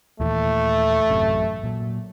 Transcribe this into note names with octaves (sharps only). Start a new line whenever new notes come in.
D#2 A#2 E3 A3
A1 F#2 C3
A#2 F#3